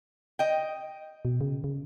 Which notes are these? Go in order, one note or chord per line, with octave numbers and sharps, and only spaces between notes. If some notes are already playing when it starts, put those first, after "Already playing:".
D#5 G5
B2
C#3
C#3